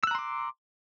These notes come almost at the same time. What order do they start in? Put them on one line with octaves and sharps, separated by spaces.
E6 F#6 A#5 C6 D6